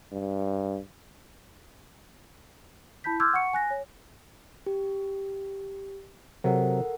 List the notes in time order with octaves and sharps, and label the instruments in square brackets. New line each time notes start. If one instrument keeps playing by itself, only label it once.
[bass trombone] G2
[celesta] E4 A5 B5 G6 B6
C6 D6 E6 F6 G6 G#6
F#5 C#6 C#7
G#5 F#6 A#6
C#5
[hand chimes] G4
[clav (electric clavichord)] C3 F#3 [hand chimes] A4 A#4 F#5